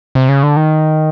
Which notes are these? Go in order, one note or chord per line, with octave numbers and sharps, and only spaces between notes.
C3
C#3
D3
D#3